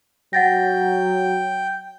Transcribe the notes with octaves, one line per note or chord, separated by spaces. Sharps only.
F#3 F#5 G5 A6 A#6